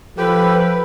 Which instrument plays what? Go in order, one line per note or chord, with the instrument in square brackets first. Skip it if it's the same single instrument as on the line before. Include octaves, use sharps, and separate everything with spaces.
[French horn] F3 [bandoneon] G4 [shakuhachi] A4 [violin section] B4